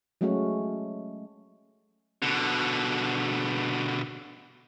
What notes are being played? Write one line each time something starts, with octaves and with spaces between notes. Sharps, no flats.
F#3 G#3 A3 C#4 F#4
B2 D3